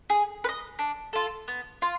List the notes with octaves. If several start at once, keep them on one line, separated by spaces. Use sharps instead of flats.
G#4
B4
D#5
D4
F4 A4
B3
F4